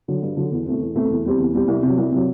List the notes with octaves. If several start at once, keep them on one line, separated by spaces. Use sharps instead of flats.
D3 F#3
G2
D3 F#3
E2
B2 A3 C4
E2
B2 A3 C4
E2
B2 G3 C4 G4
E2
B2 G3 C4 G4
C2
C3 F#3
C2
C3 F#3